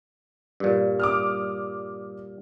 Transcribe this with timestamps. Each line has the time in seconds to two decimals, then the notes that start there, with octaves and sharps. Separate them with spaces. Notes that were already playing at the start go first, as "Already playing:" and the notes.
0.60 G2 A#2
1.00 D6 D#6 F6